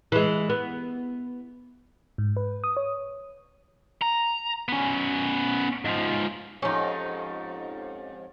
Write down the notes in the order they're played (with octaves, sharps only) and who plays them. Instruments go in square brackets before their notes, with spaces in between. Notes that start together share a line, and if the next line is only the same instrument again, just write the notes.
[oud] E3 G#3
B3
[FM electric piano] G#2
B4
D#6
C#5
[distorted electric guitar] A#5
B3 C#4
G#2 F3
[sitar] F2 G#2 G4 [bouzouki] C#4 D#4